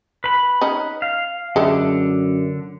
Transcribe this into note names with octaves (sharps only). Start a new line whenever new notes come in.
B4 B5
C#4 D#4
F5
F#2 D3 G#3 A3